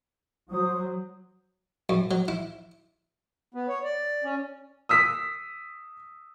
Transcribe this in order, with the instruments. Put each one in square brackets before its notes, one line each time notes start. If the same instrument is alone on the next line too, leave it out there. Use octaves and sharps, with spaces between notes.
[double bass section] F#3 [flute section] C5 D#6
[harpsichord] F#2
F#3
E4
[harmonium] B3
C#5
D5
C#4
[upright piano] D#6 E6 B6